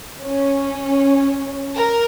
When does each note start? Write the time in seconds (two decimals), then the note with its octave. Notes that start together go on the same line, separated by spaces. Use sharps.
0.23 C#4
1.76 A#4